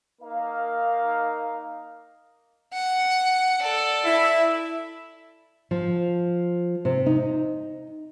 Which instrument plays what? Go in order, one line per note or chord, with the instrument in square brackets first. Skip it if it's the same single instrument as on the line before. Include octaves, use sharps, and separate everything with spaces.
[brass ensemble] A#3 D#4 A#4 F5
[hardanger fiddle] F#5
A4 D5
[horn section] E4 E5
[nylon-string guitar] F3
C3
D#4